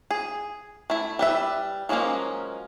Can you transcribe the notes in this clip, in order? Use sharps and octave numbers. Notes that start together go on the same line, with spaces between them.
G#4
A3 E4
G3 B4 E5
F3 F#3 G#3 A#3 C#4